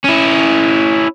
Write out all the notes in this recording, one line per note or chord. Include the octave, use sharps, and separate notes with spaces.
C#4 E4